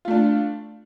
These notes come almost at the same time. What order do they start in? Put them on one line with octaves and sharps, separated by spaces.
F4 A3 D4